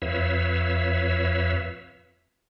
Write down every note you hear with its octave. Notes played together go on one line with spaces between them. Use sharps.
F2 B4 C#5 E5 F5 E6